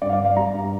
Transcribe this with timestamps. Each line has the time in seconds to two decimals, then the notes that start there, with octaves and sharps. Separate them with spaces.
0.02 G2 D5
0.09 F5
0.13 D5
0.19 G2
0.25 F5
0.37 G3 A#5
0.54 G2